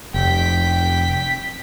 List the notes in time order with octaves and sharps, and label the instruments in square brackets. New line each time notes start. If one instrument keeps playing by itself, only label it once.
[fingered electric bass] F1 [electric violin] G5 B6